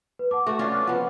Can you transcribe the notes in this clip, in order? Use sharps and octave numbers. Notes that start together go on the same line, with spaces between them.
B4
F#5 A5 D6
A3 F#4
C#4 D4 F4
D6 F6 F#6
F3 B3 F#5